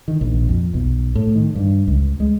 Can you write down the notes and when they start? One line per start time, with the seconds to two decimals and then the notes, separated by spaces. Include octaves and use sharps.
0.08 D#3
0.21 A#1
0.49 F2
0.74 B1
1.15 A2
1.35 D#3
1.55 G2
1.87 C#2
2.20 G#3